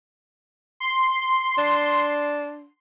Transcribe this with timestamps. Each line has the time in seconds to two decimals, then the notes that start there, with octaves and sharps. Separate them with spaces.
0.80 C6
1.58 D4